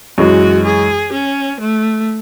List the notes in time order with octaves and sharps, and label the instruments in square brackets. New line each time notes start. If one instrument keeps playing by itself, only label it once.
[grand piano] F#2 E3 G#3 [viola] F#4
[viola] G#4
C#4
A3